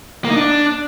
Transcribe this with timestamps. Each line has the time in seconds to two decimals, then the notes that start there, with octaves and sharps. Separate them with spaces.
0.25 A#3
0.30 D#4
0.36 D4